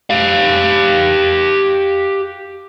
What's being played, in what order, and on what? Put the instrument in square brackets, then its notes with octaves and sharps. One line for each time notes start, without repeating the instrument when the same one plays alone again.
[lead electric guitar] G4 F5